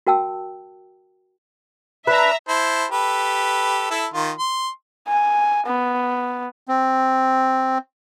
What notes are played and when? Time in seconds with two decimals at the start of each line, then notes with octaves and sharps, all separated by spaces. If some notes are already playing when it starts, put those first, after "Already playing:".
0.07 F#4 A#4 G5 A5 E6
2.07 D4 B4 E5 A#5
2.48 E4 C5 A5
2.91 G4 A4 B4
3.91 E4 A4
4.14 D#3 F4
4.39 C6
5.07 G#5
5.66 B3
6.68 C4